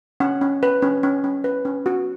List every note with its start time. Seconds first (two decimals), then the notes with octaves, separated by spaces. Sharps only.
0.20 C#4 F#5
0.41 C#4
0.63 B4
0.82 C#4
1.03 C#4
1.24 C#4
1.44 B4
1.65 C#4
1.86 F#4